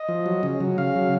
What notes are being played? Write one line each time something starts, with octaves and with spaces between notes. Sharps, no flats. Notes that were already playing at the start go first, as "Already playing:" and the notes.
Already playing: D#5
F3
F#3
C#3
F#3
C#3 F5
F#3